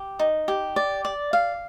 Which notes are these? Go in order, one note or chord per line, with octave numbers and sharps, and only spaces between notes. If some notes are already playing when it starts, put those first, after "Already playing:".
Already playing: G4
D#4
G4
D5
D5
F5